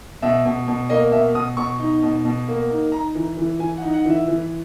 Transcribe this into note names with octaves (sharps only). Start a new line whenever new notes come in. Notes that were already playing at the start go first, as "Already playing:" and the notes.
B2 E5
B2
B2
A#3 D#5
B2 E5
B2 D#6
B2 C#6
D#4
B2
B2
A#3
D#4
D#4 A#5
E3
E3
E3 G#5
F#5
D#4
F#5
E3 E5
E3